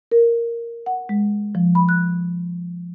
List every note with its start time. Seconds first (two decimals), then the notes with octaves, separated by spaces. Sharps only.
0.12 A#4
0.86 F#5
1.09 G#3
1.55 F3
1.75 B5
1.89 F#6